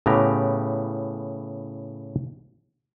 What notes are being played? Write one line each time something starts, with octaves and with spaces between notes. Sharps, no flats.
A2 C#3 B3 G4 A#5